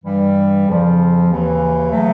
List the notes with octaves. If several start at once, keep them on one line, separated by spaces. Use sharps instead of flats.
G2 E3 G3
F2 C#3 F3
D#2 C#3 E3
C#3 F#3 A3